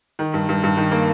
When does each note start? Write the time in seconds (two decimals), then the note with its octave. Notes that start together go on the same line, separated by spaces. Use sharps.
0.19 D#3
0.34 G2
0.49 G2
0.64 G2
0.77 D#3
0.92 A#3